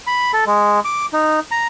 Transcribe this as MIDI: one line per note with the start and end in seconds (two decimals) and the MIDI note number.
0.07 0.32 83
0.33 0.45 69
0.47 0.80 56
0.85 1.06 86
1.13 1.40 63
1.51 1.67 82